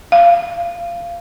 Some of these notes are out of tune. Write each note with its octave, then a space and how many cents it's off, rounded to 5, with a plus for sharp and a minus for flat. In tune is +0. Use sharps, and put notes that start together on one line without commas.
F5 -20